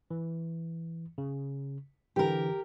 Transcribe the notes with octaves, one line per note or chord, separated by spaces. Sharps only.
E3
C#3
D3 E3 G4 A#4